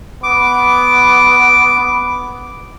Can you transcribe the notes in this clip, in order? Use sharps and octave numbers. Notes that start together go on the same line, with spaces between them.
B3 D6